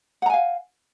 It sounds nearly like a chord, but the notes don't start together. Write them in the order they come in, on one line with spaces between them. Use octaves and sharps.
F#5 A#5 G#5 F5